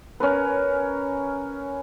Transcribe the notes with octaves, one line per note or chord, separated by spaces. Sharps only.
C#4 A#4 B4